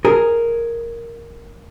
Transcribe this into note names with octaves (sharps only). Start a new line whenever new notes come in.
G#4 A#4